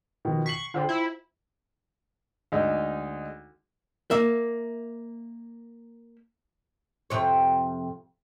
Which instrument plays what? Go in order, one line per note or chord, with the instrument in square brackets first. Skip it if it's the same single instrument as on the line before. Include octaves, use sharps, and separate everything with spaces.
[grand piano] B2 D#3 F3
[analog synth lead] C#6 [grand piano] B6 C7 F#7
[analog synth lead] D3 [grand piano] F4 C5 G5
[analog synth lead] E4
[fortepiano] D2 G#3 D#4
[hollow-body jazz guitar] A#3 E5
[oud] F2 C3 C#5